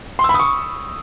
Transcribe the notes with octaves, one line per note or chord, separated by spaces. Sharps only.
C6
E6
B5
D#6
C#6